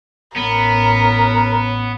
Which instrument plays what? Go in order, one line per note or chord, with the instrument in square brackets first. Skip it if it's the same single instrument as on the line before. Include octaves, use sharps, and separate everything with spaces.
[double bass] A1 C#4 [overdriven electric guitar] B3 [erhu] A#4